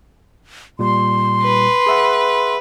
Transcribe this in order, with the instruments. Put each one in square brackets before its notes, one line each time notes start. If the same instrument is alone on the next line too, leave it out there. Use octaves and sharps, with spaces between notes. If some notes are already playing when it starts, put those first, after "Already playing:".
[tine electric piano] A#2 G3 [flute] C6
[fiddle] B4
[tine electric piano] G#4 E5 F#5